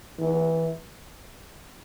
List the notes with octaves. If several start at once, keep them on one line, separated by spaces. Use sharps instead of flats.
E3